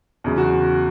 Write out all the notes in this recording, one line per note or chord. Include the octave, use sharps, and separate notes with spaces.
E2 C#3 F#3
F#4